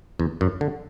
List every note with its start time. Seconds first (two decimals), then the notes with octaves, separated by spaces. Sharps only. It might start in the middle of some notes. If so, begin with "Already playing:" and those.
0.20 E2
0.41 F#2
0.61 D3